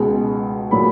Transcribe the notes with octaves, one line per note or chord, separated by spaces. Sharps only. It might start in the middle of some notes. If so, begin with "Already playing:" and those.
Already playing: C#2 B2 G#3
A#2 F#3 A3 B5